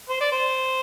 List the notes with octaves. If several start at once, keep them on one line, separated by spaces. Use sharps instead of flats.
C5
D5
C5